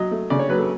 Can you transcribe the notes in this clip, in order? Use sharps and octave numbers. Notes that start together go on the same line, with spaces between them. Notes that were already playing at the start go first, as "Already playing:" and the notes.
Already playing: F#3 D#5
A3
C#3 D5
C#5
F#3 B4
A4